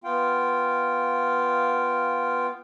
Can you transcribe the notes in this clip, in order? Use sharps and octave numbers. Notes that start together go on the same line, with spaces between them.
B3 F4 F5 G5